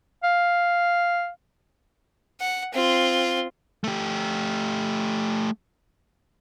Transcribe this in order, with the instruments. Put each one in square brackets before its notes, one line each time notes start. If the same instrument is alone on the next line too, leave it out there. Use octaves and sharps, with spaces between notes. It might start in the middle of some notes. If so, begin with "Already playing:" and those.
[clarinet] F5
[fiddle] F#5
C4 F4
[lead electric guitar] A3 G4